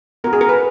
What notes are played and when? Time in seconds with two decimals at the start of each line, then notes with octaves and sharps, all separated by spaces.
0.24 B3 A#4
0.27 F#4
0.33 G#4
0.41 A#4
0.49 B4